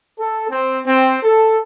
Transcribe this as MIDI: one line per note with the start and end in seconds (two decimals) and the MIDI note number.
0.19 0.47 69
0.50 0.80 60
0.86 1.17 60
1.23 1.57 69